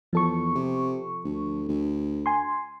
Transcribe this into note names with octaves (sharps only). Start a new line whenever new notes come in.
E2 F3 A4 C#6
C3
D2
D2
G#5 C6